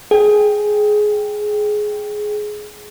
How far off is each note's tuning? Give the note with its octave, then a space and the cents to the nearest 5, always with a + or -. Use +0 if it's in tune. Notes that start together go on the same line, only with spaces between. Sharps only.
G#4 +15 G5 +0